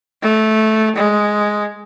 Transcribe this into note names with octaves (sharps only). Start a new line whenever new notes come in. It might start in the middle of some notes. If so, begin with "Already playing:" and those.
A3
G#3